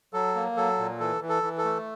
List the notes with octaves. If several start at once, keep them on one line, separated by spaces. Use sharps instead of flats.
F#3 A4
A#3
F#3 A4
A#2
E3 A4
E3
A4
E3
A4
A3